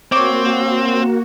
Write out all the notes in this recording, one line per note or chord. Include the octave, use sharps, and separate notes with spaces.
A#3 C4 F#4 C#5 D6